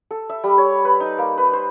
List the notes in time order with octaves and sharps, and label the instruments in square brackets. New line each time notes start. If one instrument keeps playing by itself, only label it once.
[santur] A4
E5
G3
C#5
B4
D#4
A#3
B4
C5